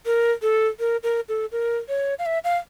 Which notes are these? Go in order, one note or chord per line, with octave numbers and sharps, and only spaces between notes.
A#4
A4
A#4
A#4
A4
A#4
C#5
F5
E5
F5